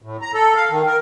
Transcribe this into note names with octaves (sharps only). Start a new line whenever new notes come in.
A2
A#5
A4
F5
D#3
A#4